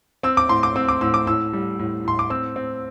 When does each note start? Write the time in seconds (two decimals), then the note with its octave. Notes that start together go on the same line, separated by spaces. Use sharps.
0.23 C4 E6
0.37 D6
0.49 A2 C6
0.63 D6
0.76 C4 E6
0.89 D6
1.01 A2 E6
1.14 D6
1.27 A2 E6
1.53 G3
1.79 A2
2.05 A2 C6
2.19 D6
2.30 C4 E6
2.56 C4